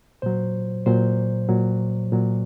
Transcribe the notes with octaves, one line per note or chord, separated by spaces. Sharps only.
A#2 F#3 C5
A#2 F#3 C5
A#2 F#3
A#2 F#3